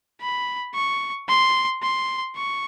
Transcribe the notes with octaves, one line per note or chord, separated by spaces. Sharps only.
B5
C#6
C6
C6
C#6